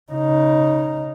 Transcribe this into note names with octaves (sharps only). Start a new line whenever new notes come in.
C#3 D#4